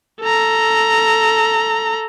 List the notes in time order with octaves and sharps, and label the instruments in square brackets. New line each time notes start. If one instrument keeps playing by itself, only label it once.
[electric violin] A4 A#5